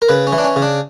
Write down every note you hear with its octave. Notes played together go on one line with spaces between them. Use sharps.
A#4
C#3 B4
C#4
E3
D4
C#4
C#3
D4